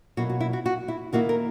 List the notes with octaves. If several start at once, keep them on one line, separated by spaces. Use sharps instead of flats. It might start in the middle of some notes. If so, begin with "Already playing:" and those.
B2 F#3 A#3 E4 F#4
F#4
E4
F#4
F#4
E4
D#3 A#3 E4 F#4
A#4